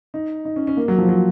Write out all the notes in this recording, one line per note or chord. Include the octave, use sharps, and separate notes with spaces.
D#4
D#4
C#4
C#4
A#3
F#3
F3
F#3